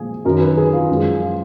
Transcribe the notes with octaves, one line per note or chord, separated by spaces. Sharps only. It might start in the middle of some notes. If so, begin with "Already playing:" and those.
Already playing: A#2 F3 G#3 G#4
F#2 D#3 F#3 A#4
B4
G#4
F4
F#2 F3 G#3
F4